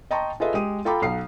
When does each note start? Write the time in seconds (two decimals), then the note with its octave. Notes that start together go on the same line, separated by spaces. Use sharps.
0.11 D#5 G5 A5 A#5 C6 C#6
0.40 F4 G#4 A4 B4 D#5 E5
0.54 G#3 G4 D#6 D#7
0.85 F4 A4 G5 A#5 B5 D6
1.02 B1 F5 C7